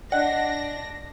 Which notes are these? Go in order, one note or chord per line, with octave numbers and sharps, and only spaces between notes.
D4 D5 D#5 F#5 A#6